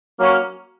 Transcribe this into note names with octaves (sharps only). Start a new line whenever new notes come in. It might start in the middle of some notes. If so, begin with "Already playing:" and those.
F#3 A#3 C#4 F#4